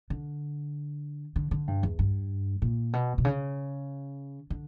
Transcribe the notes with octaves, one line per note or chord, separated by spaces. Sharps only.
D3
D3
D3
G2
E2
G2
A#2
B2
B2
C#3
D3